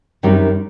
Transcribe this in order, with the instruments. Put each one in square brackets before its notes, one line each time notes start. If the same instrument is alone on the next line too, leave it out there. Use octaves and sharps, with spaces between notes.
[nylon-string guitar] F#2 D#3 G3 C4